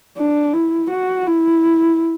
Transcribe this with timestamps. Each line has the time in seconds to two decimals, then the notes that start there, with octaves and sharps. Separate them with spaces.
0.18 D4
0.54 E4
0.90 F#4
1.27 E4